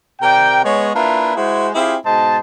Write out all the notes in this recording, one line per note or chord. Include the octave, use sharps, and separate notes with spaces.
C3 A#4 D5 G5
G#3 B3 C#5
A#3 D4 E4 F4 B4
G#3 E4 F#4 G#4 C5
C4 E4 F4 G4 G#4
G#2 B2 C5 D#5 A5